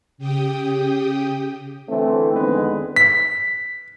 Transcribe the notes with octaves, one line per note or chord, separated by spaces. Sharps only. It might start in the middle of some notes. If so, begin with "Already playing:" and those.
C#3 G4 G5 D#6
D3 E3 A3 C4
F2 D3 D#3 G#3 B3 B4
B6